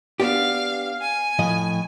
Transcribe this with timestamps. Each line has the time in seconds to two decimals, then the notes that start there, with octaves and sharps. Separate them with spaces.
0.20 B3 D4 G4 F5
1.00 G#5
1.39 A2 F3 D#5